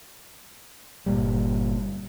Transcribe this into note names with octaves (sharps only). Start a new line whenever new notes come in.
G1 C2 A#2 G3